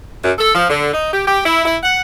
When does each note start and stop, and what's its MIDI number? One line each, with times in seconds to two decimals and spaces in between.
0.23 0.32 42
0.37 0.50 69
0.54 0.68 53
0.69 0.90 50
0.94 1.10 63
1.12 1.23 67
1.27 1.40 67
1.44 1.62 64
1.64 1.78 64
1.82 2.01 78